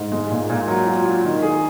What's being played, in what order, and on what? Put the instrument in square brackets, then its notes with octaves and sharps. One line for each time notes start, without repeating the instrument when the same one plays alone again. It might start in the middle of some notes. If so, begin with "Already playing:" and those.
Already playing: [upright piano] G#2
G#3
A#2
A#2
F#3
F4
F4
D#3
G#4